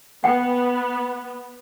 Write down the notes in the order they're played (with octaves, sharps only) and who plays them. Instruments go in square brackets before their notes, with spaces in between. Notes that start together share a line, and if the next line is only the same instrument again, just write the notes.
[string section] B3 [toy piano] F#5 G5